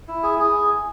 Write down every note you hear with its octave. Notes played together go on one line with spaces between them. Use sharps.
E4
G#4
G#4